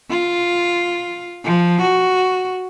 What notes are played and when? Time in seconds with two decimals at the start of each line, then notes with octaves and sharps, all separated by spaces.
0.10 F4
1.44 F3
1.81 F#4